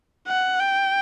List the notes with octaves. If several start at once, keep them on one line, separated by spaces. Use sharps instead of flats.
F#5
G5